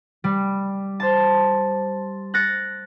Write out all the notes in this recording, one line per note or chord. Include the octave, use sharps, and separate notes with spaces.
G3
C5 A5
F#6 A6 A#6 C#7